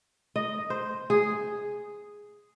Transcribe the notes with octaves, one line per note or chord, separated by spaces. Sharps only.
D#5
C5
G#4